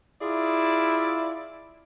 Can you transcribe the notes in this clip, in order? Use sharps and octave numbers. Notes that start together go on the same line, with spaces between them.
E4 F4 G#4 D5